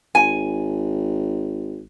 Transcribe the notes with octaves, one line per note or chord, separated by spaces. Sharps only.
G#1 G#5